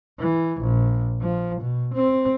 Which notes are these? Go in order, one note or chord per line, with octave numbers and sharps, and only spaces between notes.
E3
A#1
F3
B2
C4